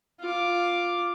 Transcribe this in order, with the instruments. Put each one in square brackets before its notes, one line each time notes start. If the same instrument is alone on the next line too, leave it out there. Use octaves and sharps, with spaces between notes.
[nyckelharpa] F4 D6